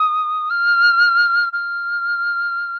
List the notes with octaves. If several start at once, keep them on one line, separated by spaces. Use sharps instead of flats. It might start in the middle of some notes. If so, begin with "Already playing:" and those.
Already playing: D#6
F6
F6